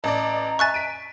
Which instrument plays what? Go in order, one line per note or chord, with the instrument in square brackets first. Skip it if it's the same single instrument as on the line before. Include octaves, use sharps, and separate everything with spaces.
[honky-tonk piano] A1 D5 [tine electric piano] D#5 A5 [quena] A#5
[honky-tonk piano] E5 G#5 [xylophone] C#6 F#6 A6
[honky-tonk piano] B6 D7 D#7